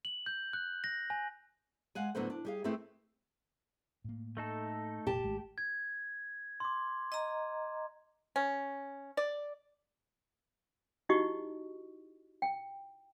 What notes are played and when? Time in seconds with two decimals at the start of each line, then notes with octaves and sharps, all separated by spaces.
0.05 F#7
0.26 G6
0.53 F#6
0.84 A#6
1.10 G#5
1.95 G#3 F5 F#5 G#5
2.15 A2 D3 F#3 B3 B4 C5
2.30 D4
2.45 G3 G#4 F5
2.64 A3 C4 E4 G#4 A4 B4
4.04 A2 A#3
4.37 A3 D#4 A4
5.07 F1 A#2 G4 A5
5.24 G#1 G#3 A3
5.58 G#6
6.60 C6 D6
7.12 D#5 A#5
8.36 C#4
9.17 D5
11.09 D#4 E4 F#4 G4 D#5 C#6
12.42 G5